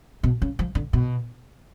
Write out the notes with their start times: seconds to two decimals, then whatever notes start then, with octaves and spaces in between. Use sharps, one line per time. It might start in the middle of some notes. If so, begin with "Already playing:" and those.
0.23 B2
0.42 C#3
0.59 F3
0.75 D3
0.93 B2